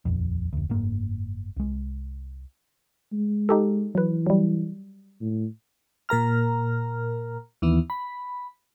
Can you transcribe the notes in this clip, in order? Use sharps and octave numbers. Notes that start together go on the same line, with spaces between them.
D#1 A#1 F2
F1 D2
F#1 G#2 A#3
C2 G#3
G#3
D#4 G4 A4
E3 F#3 B4
F#3 G3
A2
A#2 A#4 A#5 F6
D#2 E3 B3
B5